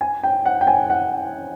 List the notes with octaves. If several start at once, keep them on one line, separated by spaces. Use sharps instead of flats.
G#5
G5
F#5
G5
G#5
F#5